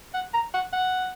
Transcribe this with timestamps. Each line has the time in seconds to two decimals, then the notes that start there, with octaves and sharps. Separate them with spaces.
0.14 F#5
0.34 A#5
0.54 F#5
0.73 F#5